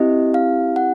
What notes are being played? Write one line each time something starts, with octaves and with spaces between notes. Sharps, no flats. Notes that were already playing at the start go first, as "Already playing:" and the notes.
Already playing: C4 E4 G4 D#5
F5
F#5